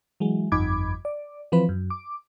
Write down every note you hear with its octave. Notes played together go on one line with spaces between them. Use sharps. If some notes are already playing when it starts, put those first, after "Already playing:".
E3 F#3 G#3
G1 F2 D#4 B5 D6 G#6
D5
E3 F3 C4 B4
F#2
D6